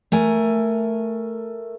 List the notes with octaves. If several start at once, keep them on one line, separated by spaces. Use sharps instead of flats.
A3 A#4 G#5